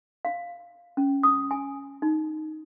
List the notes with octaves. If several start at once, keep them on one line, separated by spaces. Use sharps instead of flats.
F5
C#4
D#6
G#5
D#4